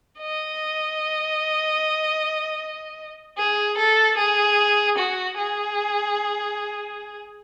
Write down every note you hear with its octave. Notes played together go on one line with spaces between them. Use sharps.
D#5
G#4
A4
G#4
F#4
G#4